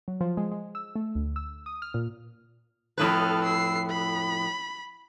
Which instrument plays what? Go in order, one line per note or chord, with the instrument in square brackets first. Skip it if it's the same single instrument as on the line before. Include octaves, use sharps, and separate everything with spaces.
[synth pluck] F#3
F3
G#3
G#3
E6
A3
D2
E6
D#6
F6
A#2
[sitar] F2 A2 B4 [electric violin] A4 F6
[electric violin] E6 C7
B5